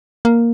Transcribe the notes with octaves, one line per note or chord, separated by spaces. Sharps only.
A#3